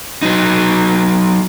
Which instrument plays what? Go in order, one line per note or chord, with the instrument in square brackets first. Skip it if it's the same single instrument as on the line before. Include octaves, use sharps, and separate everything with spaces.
[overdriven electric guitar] F#3 D#4